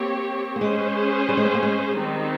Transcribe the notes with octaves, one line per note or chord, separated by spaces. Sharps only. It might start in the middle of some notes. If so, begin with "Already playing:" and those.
Already playing: A#3 C4 G4 C#5
A#3
G#3 C#4 G#4 C5
G3
G#3
C4
A#3
G#3
D#3 G3 C4 D#4